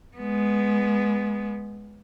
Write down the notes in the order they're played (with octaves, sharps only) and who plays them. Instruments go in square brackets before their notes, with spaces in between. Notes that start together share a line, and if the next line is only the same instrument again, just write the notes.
[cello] G#3 B3